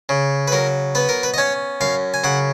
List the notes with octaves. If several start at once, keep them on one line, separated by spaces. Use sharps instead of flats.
C#3
B4
F#3 A#4
B3 B4
A#4
B4
D#5
C#4 C#5
F#2 F5
G#5
C#3 F#5